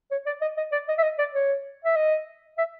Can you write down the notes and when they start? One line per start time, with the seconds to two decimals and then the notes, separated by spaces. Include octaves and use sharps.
0.11 C#5
0.26 D5
0.41 D#5
0.57 D#5
0.72 D5
0.88 D#5
0.98 E5
1.03 D#5
1.18 D5
1.34 C#5
1.85 E5
1.96 D#5
2.58 E5